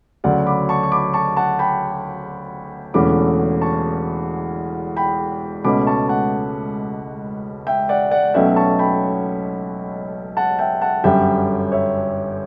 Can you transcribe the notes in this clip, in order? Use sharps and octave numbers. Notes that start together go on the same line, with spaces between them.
D2 C#3 F#3 C#4 D5 F#5
B5 D6
A5 C#6
C#6
B5 D6
A5 C#6
F#5 A5
G5 B5
E1 E2 D3 A3 C#4 B5 D6
A5 C#6
G5 B5
C#2 B2 A3 C#4 B5 D6
A5 C#6
F#5 A5
E5 G5
D5 F#5
D5 F#5
B1 B2 F#3 A3 C#4 E5 G5
A5 C#6
G5 B5
F#5 A5
E5 G5
F#5 A5
G1 F#2 D3 G3 C#4 E5 G5
C#5 E5